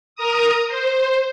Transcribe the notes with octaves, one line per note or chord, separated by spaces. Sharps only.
A#4 A#5 D#6
C5